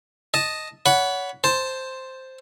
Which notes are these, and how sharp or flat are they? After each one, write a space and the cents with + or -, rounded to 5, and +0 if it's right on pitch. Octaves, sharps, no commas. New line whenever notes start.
D#5 +0 A5 +0
C#5 +30 F#5 +0 B5 +0
C5 +0 A5 +0